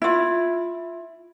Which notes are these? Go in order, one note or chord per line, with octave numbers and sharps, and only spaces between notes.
E4 F4